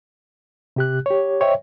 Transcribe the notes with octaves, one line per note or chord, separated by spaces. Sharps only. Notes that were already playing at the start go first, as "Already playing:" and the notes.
C3 G4 F#6
G4 C#5
C5 C#5 D#5 E5 G5